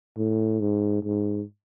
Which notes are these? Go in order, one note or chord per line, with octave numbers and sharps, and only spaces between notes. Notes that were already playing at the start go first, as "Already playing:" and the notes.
A2
G#2
G#2